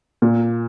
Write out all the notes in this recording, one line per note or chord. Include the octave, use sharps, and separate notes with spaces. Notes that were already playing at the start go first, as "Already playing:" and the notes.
A#2